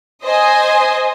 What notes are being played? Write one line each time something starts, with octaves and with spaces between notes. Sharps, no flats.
C5 D#5 G#5